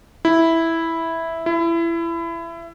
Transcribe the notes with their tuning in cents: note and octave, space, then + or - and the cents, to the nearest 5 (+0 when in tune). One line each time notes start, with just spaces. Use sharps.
E4 -5
E4 +25